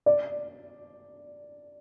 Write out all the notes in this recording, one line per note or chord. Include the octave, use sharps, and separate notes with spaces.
D5